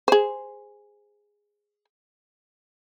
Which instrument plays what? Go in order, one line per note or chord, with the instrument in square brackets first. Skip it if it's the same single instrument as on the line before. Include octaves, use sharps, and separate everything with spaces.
[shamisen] G#4 C5